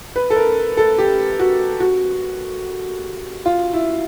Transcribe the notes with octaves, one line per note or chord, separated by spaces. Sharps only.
B4
A4
A#4
A4
G4
F#4
F#4
F4
E4